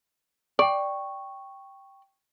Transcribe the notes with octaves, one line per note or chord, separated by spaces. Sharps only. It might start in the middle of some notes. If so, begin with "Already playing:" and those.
D5 G5 C#6